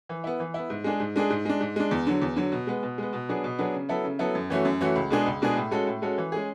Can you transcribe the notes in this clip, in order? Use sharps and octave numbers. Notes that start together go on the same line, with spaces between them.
E3
B3 E4
E3
B3 E4
G#2
G#3 D4 G#4
G#2
G#3 D4 G#4
G#2
G#3 D4
G#2
G#3 D4
E2
D3 F#3
E2
D3 F#3
B2
G#3 B3
B2
G#3 B3
B2
F#3 B3 D4 G#4
B2
F#3 B3 D4 G#4
C#3
F#3 B3 E4 A4
C#3
F#3 B3 E4 A4
F#2
E3 A3 C#4 F#4
F#2
E3 A3 C#4 F#4
C#2
B2 G#3 D4 G#4
C#2
B2 G#3 D4 G#4
A2
G#3 C#4 F#4 A4
A2
G#3 C#4 F#4 A4
E3
G#3 C#4 G#4